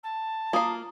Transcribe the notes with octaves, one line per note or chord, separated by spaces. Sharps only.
A5
A#3 F4 F5 A#5 D#6